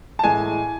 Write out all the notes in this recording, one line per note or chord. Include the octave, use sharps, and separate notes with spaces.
A5
A2 E3 G#3 G#5